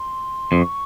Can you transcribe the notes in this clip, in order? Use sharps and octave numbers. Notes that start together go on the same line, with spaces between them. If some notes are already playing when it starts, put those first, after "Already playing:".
Already playing: C6
F2
C#6